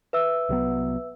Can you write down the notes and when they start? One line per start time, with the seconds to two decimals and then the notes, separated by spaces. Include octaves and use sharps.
0.13 B4 E5 E6
0.49 C2 F#3 B3